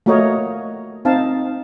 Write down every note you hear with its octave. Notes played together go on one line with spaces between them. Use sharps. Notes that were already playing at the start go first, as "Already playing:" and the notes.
A3 A#3 F#4 A#4 C#5 D#5
C4 D#4 F5 A5